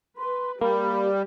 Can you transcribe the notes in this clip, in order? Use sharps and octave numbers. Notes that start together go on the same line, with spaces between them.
B4 C6
G3 A#3 G4 B5